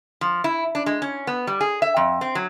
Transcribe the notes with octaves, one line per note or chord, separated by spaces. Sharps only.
F3
E4
D4
G#3
C#4
B3
G3
G#4
E5
F2
C4
F#3